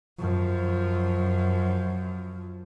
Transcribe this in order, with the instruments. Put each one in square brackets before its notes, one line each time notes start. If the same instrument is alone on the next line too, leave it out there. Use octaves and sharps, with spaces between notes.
[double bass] F#2 F3